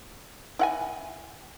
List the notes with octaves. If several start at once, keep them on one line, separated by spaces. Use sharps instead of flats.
E4 F#5 G#5